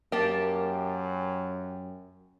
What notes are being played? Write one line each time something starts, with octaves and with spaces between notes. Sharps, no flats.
F#2 A#3 G4 A5